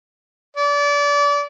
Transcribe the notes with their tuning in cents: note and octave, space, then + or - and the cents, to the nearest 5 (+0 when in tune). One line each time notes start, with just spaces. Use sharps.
D5 -30